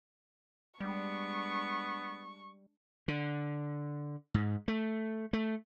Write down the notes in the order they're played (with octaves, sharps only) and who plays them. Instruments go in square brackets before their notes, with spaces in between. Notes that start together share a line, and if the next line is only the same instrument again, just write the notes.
[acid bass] G3 [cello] G#3 D4 [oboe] B3 [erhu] C#6
[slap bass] D3
G#2
A3
A3